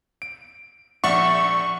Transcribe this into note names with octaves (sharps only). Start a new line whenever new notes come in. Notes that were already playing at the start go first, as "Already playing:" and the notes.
D7
A#1 D5 E5 F#5 C#6